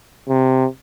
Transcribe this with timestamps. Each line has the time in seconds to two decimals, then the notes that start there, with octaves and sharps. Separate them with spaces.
0.29 C3